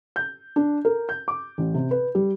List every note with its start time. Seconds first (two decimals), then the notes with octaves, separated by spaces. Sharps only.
0.16 G6
0.56 D4
0.85 A#4
1.09 G6
1.28 D6
1.58 A1
1.74 C3
1.91 B4
2.15 G3